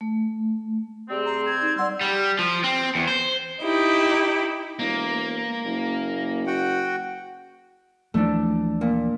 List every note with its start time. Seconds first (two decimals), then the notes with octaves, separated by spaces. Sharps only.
0.01 A3
1.09 C3 G3 C4 G#4
1.26 A#5
1.46 G#6
1.61 D#4
1.77 G3 D5 F#5 C6 E6
2.01 G3
2.39 F3
2.64 C4
2.95 E2
3.08 C5
3.62 D#4 E4 G4
4.79 E1 A#3
5.65 F#1
6.47 F#4 F#5 G5
8.14 D#2 E3 F3 A3 D4
8.81 A#2